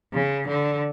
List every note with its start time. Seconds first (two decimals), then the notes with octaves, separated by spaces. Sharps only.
0.14 C#3
0.48 D3